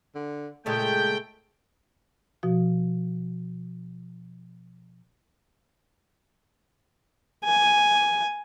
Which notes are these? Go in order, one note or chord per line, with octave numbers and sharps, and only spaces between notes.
D3
A#2 C#3 G#3 A3 G5
B2 F3 F#4
G#5